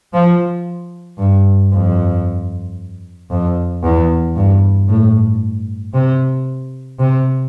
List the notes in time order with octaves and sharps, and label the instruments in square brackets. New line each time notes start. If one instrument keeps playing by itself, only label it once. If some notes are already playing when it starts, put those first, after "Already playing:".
[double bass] F3
G2
F2
F2
E2
G2
A2
C3
C3